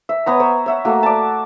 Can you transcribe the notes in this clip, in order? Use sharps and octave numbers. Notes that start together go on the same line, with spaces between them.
E5
B3 C#5 A#5
C5 C#5
C#5 E5 F#5
A3 A#3 F#4
D5 A5